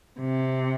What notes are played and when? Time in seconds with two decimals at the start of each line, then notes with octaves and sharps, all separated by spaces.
0.20 C3